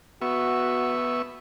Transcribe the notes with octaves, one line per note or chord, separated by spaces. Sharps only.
B3 F#4 E5 C#6